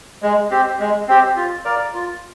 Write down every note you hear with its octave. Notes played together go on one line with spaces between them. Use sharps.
G#3
C4 G4
G#3
C4 G4
F4
A#4 D5 F5
F4